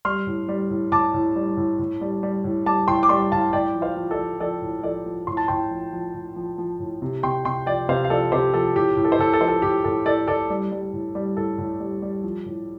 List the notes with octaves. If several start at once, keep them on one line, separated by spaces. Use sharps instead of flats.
G3 C6 F6
A2
G3
A2
A2 A5 D6
A2
G3
A2
A2
G3
G3
A2
G3 A5 D6
A2 G5 C6
D6
G3 G5 C6
A2 F5 A5
A2 D5 G5
F3
C5 F5
F3
A4 D5
F3
F3 A4 D5
A2
F3 A4 D5
F3
A2 C6
A5
A2 G5 C6
F3
F3
A2
F3
F3
A2
C3
C3 G5 C6
C3 G5 C6
F3 D5 G5
C3 C5 F5
F5
F3 A4 D5
C3 G4 C5
F3 A4
A2 G4
A2
A4
C5
A2 A4
A4
F3 C5
A4
A2 G4
A2 A4
A2 A4 D5
A2 A4 D5
G3
G3
A2
G3
A2 A4
A2
G3
G3
F3
A2